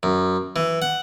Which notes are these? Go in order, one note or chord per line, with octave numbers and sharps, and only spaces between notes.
F#2
E3
F#5